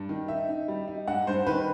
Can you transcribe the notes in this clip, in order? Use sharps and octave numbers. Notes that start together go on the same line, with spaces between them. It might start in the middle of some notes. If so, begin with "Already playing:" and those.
Already playing: G2
D#3
D#4 E5
D#4
G3
D#4
G2 F#5
G2 C5
D#3 B4